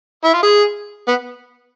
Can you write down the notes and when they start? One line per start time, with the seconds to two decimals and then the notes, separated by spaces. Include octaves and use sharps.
0.24 E4
0.34 F4
0.43 G#4
1.08 B3